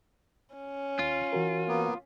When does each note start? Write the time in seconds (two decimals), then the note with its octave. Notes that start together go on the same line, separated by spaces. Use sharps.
0.55 C#4
0.99 D#2 F4
1.33 E3 F#4 A#4
1.68 A#3 B3